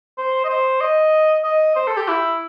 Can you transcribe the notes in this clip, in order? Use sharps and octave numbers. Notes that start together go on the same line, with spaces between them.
C5
D#5
C5
D#5
D#5
C5
A4
G4
E4